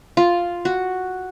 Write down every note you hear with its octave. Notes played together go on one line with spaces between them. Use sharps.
F4
F#4